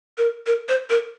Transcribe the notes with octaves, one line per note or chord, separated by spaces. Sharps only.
A#4
A#4
C5
A#4